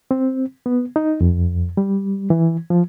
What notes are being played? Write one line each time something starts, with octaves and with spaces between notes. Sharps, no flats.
C4
B3
D#4
F2
G3
E3
F3